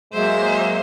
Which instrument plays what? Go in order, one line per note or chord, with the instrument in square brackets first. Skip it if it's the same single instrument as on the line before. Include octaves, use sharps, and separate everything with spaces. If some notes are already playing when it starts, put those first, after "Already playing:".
[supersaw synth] F#3 A#3 [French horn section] G#3 [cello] C5 E5